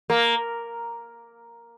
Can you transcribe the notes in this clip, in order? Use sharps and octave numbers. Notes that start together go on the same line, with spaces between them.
A#3